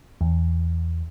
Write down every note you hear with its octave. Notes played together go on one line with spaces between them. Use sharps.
E2